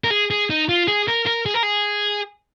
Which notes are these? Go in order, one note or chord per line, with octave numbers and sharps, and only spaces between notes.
A#4
G#4
G#4
D#4
F4
G#4
A#4
A#4
G#4
A#4
G#4